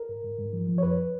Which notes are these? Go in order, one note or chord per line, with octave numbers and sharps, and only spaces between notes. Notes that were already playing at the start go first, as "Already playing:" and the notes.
Already playing: A#4
G#2
G#2
G#2
F3
F3
C#5
F2 B4